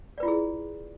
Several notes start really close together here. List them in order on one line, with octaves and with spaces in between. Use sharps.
D5 B4 F4 E4 G#4